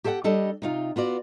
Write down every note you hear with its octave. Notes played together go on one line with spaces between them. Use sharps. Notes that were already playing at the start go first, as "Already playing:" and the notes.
G4 A4 C5 E5 F#5 G5
G3 D4 A4 D#5
C3 D#4 F4
B3 F4 F#4 D5